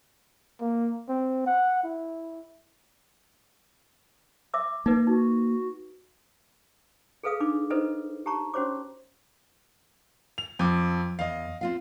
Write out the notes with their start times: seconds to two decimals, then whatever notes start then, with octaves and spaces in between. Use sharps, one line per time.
0.61 A#3
1.09 C4
1.46 F#5
1.84 E4
4.54 E5 D6 E6
4.86 A#3 D#4 B4
5.07 D#4 F#4
7.23 G#4 A4 B4 F5 D#6
7.40 D4 D#4 D6
7.70 D#4 E4 A4 B4 C5 D#5
8.26 G4 A5 A#5 C#6
8.54 C#4 F#4 C5 C#5 D6
10.38 F7
10.59 F2 F3 D6
11.19 E2 D#5 F5
11.61 C4 F4 F5